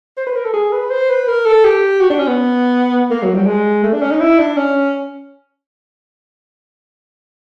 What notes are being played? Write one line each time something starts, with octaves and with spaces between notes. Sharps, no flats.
C5
B4
A#4
A4
G#4
B4
C5
B4
A#4
A4
G4
F#4
D4
C#4
B3
A#3
F#3
G3
G#3
A3
D4
C#4
D#4
E4
D4
C#4